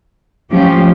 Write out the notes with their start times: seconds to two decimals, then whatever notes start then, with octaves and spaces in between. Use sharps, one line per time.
0.50 F3 A3 C#4 G4